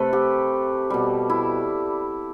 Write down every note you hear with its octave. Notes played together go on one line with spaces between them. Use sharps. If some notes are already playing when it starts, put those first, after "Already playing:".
Already playing: C3 A3 A4 B4
G4
B2 G3
E4